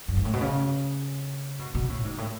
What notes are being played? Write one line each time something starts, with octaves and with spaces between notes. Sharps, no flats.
F#2
G#2
A2
B2
C#3
B2
B2
A2
G#2
A2